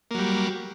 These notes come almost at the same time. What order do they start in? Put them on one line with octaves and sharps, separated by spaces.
A#3 F#3 G3